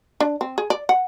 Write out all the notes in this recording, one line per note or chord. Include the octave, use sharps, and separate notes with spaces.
D4
C4
G#4
D5
F#5